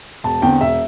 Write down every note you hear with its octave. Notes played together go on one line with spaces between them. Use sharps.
E1 A5
E2 D3 C4 G5
E1 E5